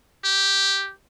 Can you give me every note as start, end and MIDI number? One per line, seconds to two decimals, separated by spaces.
0.24 0.92 67